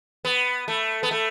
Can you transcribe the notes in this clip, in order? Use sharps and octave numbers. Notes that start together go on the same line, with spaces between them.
B3
A3
B3
A3